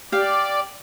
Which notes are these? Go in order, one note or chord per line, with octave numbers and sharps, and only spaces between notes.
G4 D5 F5